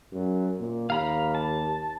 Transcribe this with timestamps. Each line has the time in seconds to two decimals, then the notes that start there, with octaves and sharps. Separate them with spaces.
0.13 F#2
0.60 A#2
0.90 D#2 F5 A#5 B5
1.35 A5